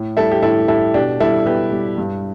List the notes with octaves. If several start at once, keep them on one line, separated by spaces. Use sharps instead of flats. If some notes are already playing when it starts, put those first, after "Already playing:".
Already playing: A2
G3 E4 A4
G4
A2 E4 A4
G3 E4 A4
B2 D4 G4
G3 E4 A4
B2 G4 B4
G3
G2